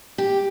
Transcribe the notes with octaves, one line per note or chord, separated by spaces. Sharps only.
G4